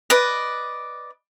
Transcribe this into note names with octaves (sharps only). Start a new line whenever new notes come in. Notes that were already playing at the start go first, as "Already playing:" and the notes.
B4 D5 D#5